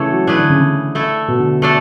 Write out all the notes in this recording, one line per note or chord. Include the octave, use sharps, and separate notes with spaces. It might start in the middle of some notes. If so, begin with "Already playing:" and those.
Already playing: C#3 E3 A3 D4 A4 C#5
F#3
E3 A3 D4 G#4 B4
D3
C#3
C#3
A3 E4 A4
B2
D3
A3 D4 A4